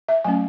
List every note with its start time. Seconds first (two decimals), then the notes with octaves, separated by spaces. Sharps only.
0.09 E5
0.24 F#3 A3 C#4 G#5